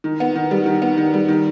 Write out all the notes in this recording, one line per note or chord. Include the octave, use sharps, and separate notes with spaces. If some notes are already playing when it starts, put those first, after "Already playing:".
D#3
B3
D#3
G3
D#3
B3
D#3
G3
D#3